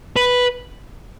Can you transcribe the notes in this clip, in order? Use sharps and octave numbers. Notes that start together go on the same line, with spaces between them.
B4